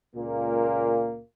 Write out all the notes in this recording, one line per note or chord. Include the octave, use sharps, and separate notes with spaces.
C#2 A#2 A#3